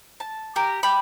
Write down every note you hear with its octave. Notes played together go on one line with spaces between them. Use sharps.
A5
G4 A#4
G4 B5